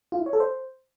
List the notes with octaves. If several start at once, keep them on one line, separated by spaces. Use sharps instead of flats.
F4
E4
C#5
A4
C5